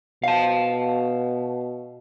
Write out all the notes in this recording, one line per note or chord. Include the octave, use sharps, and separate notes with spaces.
B2 F5 A5